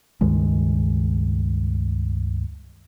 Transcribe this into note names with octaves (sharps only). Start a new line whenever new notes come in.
C#2 G2 D#3 G#3